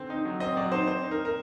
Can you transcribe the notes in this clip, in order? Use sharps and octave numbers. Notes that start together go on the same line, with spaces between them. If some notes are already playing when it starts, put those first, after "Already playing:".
Already playing: D3 C4
D#4
F#3
C4 D#5
F#3 D5
D#4 C5
C4 C5
D#4
A#4
A#4